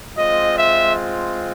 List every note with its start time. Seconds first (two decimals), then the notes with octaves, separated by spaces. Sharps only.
0.17 G#3 C4 F4 D#5
0.56 E5